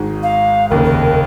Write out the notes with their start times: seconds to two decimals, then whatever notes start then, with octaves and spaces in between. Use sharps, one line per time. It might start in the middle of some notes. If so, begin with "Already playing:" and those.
Already playing: G#1 G#2 G#3
0.23 F5
0.70 F1 D#2 C#3 A#4
0.85 A#4